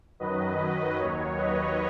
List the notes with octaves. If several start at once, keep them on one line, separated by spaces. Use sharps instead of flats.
F#2 D#3 F#3 B4 D#5
D#2 D#3 F#3 C#5
B4 D#5